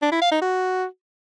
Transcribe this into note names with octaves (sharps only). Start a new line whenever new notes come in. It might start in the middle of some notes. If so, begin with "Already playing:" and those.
D4
E4
F5
D#4
F#4